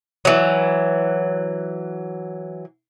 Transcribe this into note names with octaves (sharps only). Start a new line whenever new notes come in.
E3 F#3